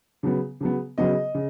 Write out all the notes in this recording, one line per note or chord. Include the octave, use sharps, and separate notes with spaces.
C#3 F#3 B3
C#3 F#3 B3
C#3 F#3 B3 D#5
C#3